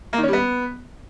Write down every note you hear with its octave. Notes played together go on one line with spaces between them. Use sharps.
A#3
D#3
C#4
G3
B3